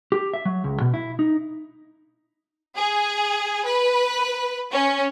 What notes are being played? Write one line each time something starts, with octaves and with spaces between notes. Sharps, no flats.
G4
E5
F#3
C#2
B2
E4
D#4
G#4
B4
C#4